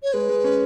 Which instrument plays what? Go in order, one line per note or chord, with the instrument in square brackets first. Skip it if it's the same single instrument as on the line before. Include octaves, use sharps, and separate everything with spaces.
[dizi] C#5
[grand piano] G#3 [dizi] B4
[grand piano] G#3
C#4